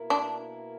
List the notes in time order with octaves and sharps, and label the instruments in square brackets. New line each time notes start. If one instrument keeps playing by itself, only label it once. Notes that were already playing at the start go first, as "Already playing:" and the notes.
Already playing: [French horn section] B2 A#3 E4 A#4
[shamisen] D4